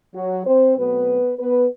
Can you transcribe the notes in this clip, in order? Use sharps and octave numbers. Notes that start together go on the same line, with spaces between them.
F#3 F#4
C4 C5
B2 F#3 A3 B3 C4 B4
B3 B4